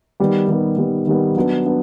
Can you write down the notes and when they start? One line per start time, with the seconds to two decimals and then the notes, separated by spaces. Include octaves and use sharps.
0.20 D#3 G3 B3
0.48 D#3 G3 B3
0.78 D#3 G3 B3
1.07 D#3 G3 B3
1.36 F#3 B3 D4
1.65 B3 D4